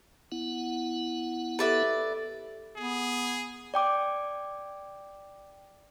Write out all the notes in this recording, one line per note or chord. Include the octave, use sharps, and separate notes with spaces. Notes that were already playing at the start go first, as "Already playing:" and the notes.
B3 E4 F#5
G4 A4 B4 D5 E5
B3 G#4
D5 G5 D6